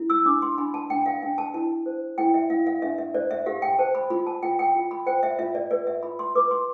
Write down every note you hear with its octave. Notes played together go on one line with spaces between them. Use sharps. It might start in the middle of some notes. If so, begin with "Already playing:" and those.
Already playing: E4
E6
D4 D6
C6
D4 B5
A5
D4 G5
F5
D4 G5
A5
E4 A5
C5
E4 G5
E5
E4 F5
F5
D4 E5
E5
C5 D5
E5
G4 F5
G5
C5 A5
B5
F4 B5
A5
F4 G5
G5
F4
B5
C5 G5
E5
F4 E5
D5
B4 D5
E5
F4 B5
C6
B4 D6
C6